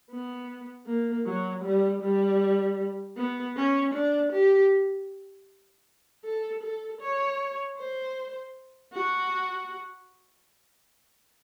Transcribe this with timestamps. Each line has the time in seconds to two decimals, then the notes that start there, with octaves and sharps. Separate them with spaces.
0.10 B3
0.86 A#3
1.26 F#3
1.64 G3
2.02 G3
3.17 B3
3.56 C#4
3.94 D4
4.32 G4
6.24 A4
6.63 A4
7.01 C#5
7.78 C5
8.93 F#4